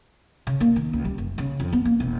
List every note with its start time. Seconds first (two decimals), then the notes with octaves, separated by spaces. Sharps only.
0.47 C#3
0.60 A#3
0.76 D#3
0.93 C#2
1.04 G3
1.18 F#1
1.38 C#3
1.60 F2
1.73 B3
1.85 A#3
2.00 E1